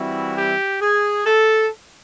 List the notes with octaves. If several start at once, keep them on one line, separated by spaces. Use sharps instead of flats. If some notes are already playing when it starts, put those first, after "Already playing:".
Already playing: E3 G3 C4 E4 F#4
G4
G#4
A4